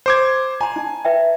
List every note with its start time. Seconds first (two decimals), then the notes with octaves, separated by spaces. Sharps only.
0.06 C5 D6 G#6
0.61 G#5 A#5 C6
0.76 D#4 A5
1.05 B4 E5 G5